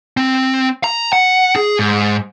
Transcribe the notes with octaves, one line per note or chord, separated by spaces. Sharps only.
C4
A#5
F#5
G#4
G#2